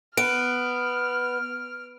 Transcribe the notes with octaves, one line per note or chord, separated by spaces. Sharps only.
B3 F6 D7